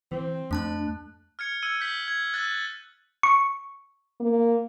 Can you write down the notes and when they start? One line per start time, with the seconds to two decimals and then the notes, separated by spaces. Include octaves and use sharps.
0.12 E3 C4
0.51 F2 A3 D4 A5 F#6
1.39 F6 G#6 C#7
1.63 E6 G#6 C#7 D#7
1.81 G6 B6 F#7
2.08 G#6
2.34 E6 F#6 A6
3.23 C#6
4.20 A#3